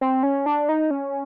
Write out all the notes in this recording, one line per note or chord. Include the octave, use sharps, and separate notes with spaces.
C4
C#4
D4
D#4
C#4